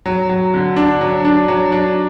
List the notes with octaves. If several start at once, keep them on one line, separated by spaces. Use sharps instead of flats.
F#3
F#3
D3
D4
F#3
D4
F#3
D4